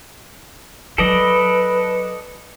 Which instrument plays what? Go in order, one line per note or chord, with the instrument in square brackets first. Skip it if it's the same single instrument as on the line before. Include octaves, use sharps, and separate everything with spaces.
[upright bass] F#3 [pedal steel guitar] A4 D5 D#5 [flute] B4